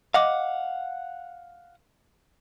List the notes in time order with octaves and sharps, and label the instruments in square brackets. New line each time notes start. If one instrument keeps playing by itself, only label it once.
[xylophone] D#5 D6 [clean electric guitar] F5 F#5